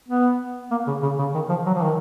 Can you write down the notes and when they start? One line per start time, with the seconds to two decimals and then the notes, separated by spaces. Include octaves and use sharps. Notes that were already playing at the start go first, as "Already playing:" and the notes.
0.09 B3
0.71 A#3
0.87 C#3
1.02 C#3
1.19 C#3
1.34 D#3
1.49 F3
1.66 F#3
1.75 F3
1.83 D#3